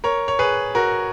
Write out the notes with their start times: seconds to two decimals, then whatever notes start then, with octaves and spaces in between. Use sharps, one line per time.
0.04 A#4 C#5
0.28 C#5
0.39 G#4 B4
0.75 F#4 A#4